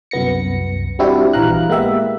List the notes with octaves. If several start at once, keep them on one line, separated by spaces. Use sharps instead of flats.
C2 F#2 B3 A#6 C#7
G3 C4 D4 E4 F#4 G4
A#1 E3 F5 A#5 F#6
G#3 A#3 B3 G4 E5